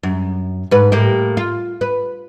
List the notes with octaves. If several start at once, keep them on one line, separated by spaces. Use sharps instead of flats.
F#2
G#2 B4
A2 A#3 G4
F4
B4